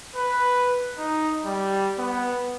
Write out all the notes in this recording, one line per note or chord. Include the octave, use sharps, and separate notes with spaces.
B4
D#4
G3
B3